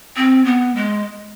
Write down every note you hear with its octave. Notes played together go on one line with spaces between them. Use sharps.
C4
B3
G#3